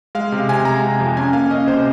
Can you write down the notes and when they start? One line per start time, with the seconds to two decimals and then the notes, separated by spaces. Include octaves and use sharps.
0.15 G#3 F5
0.32 C3
0.49 C3 G#5
0.65 G#3 A#5
0.83 C3
1.00 F2
1.17 C#4 G#5
1.33 A#3 F5
1.50 C#4 D#5
1.67 C3 C5